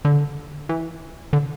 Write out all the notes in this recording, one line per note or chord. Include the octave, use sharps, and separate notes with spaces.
D3
E3
D3